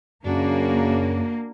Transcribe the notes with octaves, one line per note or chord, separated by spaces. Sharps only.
F#2 C#3 A#3 D4 F#4